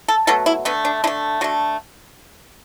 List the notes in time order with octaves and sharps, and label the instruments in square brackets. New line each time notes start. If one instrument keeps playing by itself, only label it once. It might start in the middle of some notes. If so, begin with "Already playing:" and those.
[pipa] A4
B2 F#3 A3 A4
E4
D3 A3 B3
D4
D3 A3 E4
D3 A3 F#4